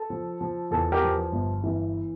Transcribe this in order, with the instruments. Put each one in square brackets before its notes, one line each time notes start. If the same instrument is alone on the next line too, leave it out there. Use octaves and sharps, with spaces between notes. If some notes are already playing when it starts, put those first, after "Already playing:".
Already playing: [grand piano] A4
F3
F3
E2 A4
G4 A#4
F3
G1
E3